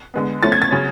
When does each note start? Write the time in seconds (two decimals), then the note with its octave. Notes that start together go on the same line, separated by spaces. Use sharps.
0.14 D3 G#3 B3
0.43 F3 A3 C#4 A6
0.52 G#6
0.62 A6
0.71 C#3 F#3 C#4